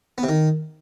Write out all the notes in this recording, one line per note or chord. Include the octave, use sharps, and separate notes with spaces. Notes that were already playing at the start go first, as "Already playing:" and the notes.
B3
C3
D#3